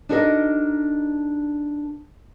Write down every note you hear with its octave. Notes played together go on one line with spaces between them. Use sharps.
D4 D#4 F#4 A4 A#4 D#5